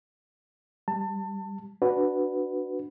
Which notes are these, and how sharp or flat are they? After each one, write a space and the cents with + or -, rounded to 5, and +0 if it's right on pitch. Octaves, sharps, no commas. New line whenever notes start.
G3 +0 A5 +25
D4 +5 F#4 +0 B4 +5